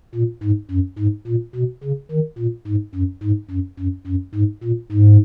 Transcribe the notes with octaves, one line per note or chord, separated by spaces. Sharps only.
A#2
G#2
F#2
G#2
A#2
B2
C#3
D#3
A#2
G#2
F#2
G#2
F#2
F#2
F#2
G#2
A#2
G#2